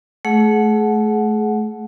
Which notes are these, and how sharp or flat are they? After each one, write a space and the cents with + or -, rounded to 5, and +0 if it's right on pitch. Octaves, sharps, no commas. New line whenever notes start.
A3 -25 G#4 +25 F#5 -5